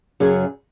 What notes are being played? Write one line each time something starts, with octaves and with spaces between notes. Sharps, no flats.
F#2 C#3 F#3 C#4 G#4